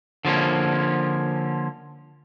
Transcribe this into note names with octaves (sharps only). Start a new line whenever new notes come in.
D3 F3 A#3 C#4